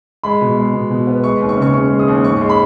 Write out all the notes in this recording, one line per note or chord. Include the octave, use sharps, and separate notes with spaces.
G#3 B5
B2
G#3
B2
B2
B3
G#3 C#6
D#2
C#6
C#3
C#6
C#3 C#6
G#3
D#6
D#2
G#2 C#6
G#3
B5